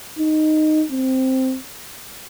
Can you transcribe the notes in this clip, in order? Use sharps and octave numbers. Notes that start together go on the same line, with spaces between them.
D#4
C4